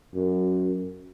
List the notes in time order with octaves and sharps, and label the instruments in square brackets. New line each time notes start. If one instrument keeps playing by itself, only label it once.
[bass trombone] F#2